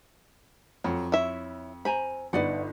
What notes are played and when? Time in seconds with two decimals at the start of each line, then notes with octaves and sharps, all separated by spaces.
0.84 F2 F#3
1.12 E4 C#5 E5
1.85 C5 G#5 A#5 B5
2.33 G1 D#4 B4 D5 F#5